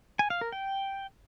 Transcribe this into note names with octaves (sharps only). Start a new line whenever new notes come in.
G#5
F5
A#4
G5